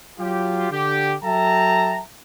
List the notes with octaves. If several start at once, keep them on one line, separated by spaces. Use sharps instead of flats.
F#3 F4 G4
D3 G4
F#3 A4 E5 G5 A5 A#5